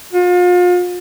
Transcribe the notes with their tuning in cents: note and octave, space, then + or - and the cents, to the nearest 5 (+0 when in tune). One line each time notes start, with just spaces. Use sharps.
F4 +35